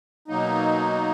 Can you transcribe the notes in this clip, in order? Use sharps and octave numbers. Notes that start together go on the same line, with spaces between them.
B2 F#3 A#3 D#4